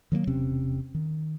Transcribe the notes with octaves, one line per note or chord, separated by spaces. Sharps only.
D#3 F#3 A3 A#3
E1 C3 C4 C#4
D#3